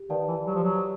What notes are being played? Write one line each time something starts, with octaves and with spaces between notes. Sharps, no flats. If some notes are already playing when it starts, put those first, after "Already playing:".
Already playing: G4
D#3 B4 D5 F5 A5
E3
F#3 G4
F3
F#3